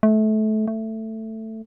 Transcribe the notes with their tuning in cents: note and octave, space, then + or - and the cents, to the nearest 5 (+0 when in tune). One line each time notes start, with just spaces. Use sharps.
A3 -25
A3 +10